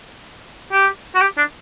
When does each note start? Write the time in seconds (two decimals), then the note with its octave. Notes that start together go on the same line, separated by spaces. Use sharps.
0.72 G4
1.15 F#4
1.21 G4
1.38 D4